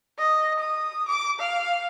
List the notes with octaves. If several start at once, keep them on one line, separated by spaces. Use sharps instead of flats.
D#5
D#6
D6
F5